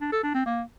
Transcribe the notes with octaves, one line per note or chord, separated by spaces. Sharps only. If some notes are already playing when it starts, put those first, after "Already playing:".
D4
A4
D4
C4
A#3